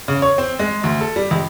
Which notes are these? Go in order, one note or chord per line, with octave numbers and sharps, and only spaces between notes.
C#3
C#5
C4
G#3
D2
A4
G3
C#2